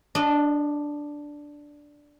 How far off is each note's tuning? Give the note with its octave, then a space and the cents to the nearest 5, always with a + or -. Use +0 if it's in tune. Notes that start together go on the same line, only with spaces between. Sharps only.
D4 +0 D#5 -30